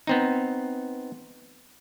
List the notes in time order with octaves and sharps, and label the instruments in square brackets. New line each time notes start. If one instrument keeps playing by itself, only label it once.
[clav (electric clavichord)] B3 C4 D#4